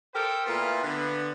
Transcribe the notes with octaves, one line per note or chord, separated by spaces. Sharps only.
G4 A4 A#4 C5 G5
A#2 A3 B3 E4 F4
D3 B3